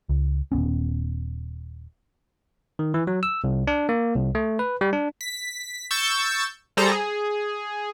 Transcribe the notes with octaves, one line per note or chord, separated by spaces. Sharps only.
C#2
D#1 F#2 B3 C#4
D#3
E3
F#3
E6
C2
D4
A#3
C2
A3
B4
G3
D4
B6
C#6 E6 G6 A6
G3 G#4 A4 C5 A#5
G#4